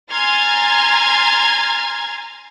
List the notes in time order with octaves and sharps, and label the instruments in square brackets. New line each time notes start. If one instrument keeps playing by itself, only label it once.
[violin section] G#5 A#5 C6 F6 G#6 A6